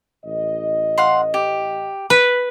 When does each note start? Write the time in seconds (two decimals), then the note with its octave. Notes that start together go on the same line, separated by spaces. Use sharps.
0.25 A1 D#5
0.98 F5 F#5 C6
1.34 G4
2.10 B4